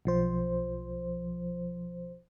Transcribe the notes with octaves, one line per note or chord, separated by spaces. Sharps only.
B1 F3 C5